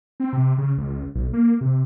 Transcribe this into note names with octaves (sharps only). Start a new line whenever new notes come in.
C4
C3
C#3
C#2
B1
A#3
C3